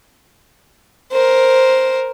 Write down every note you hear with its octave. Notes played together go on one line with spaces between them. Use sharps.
A#4 C5